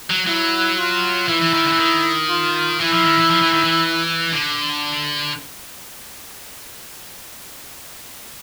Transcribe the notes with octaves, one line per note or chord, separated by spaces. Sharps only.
F#3
F#3 E4
F4
E3 E4
E3
D#3
D3
E3
D#3
F4
E3 E4
F3
D#3
E3
F3
E3
D#3
E3
D3